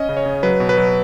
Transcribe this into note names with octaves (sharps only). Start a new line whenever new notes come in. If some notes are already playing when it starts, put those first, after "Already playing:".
Already playing: C#4 D#5
C#3
C#5
C#3
F#3 B4
B2
B4
F#3